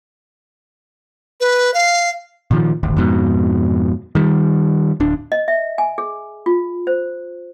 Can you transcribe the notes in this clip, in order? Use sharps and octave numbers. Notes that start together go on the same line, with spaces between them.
B4
F5
A#2 D#3 F3
D#1 G#1 D2
F2 G#2 B2
D#3 G3
D1 D4
D#5
E5
G#5
G#4
F4
C5